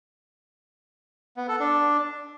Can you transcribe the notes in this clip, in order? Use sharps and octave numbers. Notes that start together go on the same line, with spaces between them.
B3
A4
D4